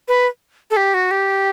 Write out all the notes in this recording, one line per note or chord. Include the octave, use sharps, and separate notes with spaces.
B4
A4
G4
F#4
G4